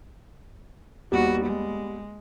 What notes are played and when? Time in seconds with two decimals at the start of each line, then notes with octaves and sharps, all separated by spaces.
1.12 D#2 G3 B3 F#4
1.45 G#3